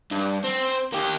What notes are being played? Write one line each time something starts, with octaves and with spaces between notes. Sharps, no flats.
G2
C4
A#3 G4